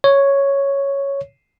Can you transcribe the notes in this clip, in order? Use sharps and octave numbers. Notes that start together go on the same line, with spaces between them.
C#5